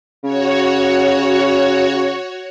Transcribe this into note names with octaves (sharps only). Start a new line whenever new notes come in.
C#3 F#4 C#5